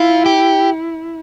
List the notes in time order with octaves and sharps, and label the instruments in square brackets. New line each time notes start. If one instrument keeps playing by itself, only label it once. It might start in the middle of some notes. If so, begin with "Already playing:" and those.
Already playing: [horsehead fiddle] E4 [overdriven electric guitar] F4
[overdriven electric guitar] G4